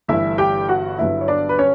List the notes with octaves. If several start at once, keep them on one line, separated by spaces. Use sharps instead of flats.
G1 G2 E3 A3 E4 E5
G4 G5
F#4 F#5
G1 G2 D3 F#3 B3 E4 E5
C#5
D4 D5
B4
C#4 C#5